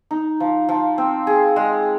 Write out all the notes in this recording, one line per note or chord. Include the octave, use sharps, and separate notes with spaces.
D#4
F3
F3
C4
G#4
G#3